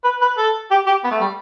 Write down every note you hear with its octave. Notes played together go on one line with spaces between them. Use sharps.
B4
B4
A4
G4
G4
B3
A3
G3